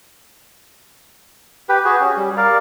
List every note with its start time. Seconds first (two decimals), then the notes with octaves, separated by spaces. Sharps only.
1.69 G4 B4
1.85 F#4 G#4
2.00 C#4
2.17 G3
2.37 A#4 D5 F5